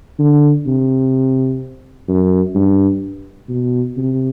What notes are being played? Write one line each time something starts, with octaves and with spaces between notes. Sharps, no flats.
D3
C3
F#2
G2
B2
C3